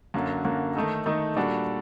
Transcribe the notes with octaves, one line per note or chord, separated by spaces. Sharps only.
F#2 D3 F#3 A#3
F#2 D3 F#3 A#3
D#3 A3 D#4 A4
D#3 A3 D#4 A4
A#2 G3 D4 F#4 A4